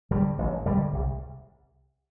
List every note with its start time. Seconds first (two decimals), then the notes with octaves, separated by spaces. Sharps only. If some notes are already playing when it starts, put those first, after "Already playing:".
0.11 G2 D3 G3
0.38 A1
0.66 G2 D3 G3
0.93 C2